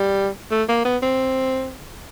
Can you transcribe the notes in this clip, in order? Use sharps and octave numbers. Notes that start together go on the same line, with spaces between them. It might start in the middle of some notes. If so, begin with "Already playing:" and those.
Already playing: G3
A3
A#3
B3
C4